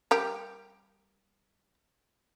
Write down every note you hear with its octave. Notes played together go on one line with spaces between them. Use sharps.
G3 G4 A#4